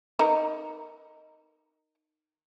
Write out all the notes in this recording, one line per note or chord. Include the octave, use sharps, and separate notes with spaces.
D#4 A#4 B4